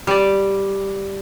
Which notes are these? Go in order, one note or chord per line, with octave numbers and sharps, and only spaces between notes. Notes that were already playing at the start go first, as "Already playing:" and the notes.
G3 D5